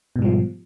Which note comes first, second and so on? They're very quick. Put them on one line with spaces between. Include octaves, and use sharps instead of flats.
B2 G#2 G3 F3